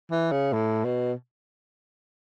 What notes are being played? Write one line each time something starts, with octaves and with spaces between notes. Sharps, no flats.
E3
C#3
A2
B2